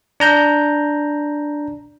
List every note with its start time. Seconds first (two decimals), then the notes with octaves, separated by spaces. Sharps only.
0.20 D4 A#5 G6